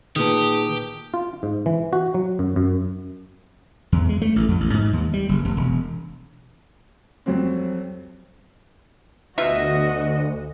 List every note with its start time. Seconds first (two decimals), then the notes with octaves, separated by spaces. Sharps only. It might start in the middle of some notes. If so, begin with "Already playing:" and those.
0.16 A#2 D#3 G4 G#4 B4 A5 D#6
1.14 F4
1.43 G#2
1.66 E3
1.93 F#4
2.14 F#3
2.39 F#2
2.56 F#2
3.92 E2
4.09 G#3
4.22 A3
4.36 A1
4.48 F2
4.61 A1
4.74 G#2
4.93 D#2
5.13 G3
5.29 F#1
5.45 F1
5.57 E1
7.26 F2 F#3 G3 C4
9.38 D2 B2 F4 F#4 D#5 E5